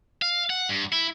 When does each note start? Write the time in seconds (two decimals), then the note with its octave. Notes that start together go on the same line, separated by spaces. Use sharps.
0.22 F5
0.50 F#5
0.69 G2
0.92 E4